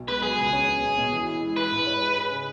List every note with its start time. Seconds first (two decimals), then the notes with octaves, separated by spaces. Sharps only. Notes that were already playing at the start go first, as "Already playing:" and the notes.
Already playing: B1
0.08 G#3 B4
0.22 F#3 G#4
0.38 C#2
0.53 C#4
0.68 B3
0.82 B2
0.98 B2
1.12 E3
1.26 E4
1.41 G#3
1.56 E4 B4
1.71 G#2
1.87 C#5
2.01 G#4
2.16 G#4
2.30 C#3